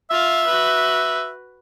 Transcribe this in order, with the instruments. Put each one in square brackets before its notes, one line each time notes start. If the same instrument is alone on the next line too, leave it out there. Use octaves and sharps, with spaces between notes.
[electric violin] F4 F5 [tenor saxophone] E5
[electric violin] F#4 B4